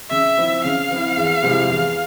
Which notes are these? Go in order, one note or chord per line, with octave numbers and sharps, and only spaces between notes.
C#3 E5
F3 C4 E4
C#3 F5
F3 C4 E4
E2
C3 F3 G#3 E4
E2